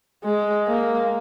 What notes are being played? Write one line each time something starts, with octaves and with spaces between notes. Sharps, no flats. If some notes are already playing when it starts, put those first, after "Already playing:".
G#3
A#3